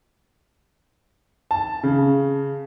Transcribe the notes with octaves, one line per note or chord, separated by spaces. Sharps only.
A5
C#3